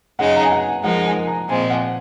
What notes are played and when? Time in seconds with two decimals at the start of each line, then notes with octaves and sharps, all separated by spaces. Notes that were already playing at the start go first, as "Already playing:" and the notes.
0.19 F#2 C#3 G#3 D#4 F#5
0.36 A#5
0.44 G#5
0.52 F#5
0.84 F3 G#3 D#4 A#4 F#5
1.06 G#5
1.27 A#5
1.49 A#2 F3 G#3 C4 G#5
1.70 F#5